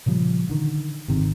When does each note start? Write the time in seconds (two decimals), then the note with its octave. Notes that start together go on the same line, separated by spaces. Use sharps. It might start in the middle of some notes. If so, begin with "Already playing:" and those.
0.06 A#2 C#3 F3 G3
0.49 D3 D#3
1.08 G#1 C3 D#3